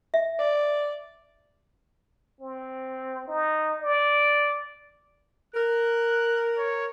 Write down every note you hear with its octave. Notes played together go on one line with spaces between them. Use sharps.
E5
D5
C4
D#4
D5
A#4 F#6
C#5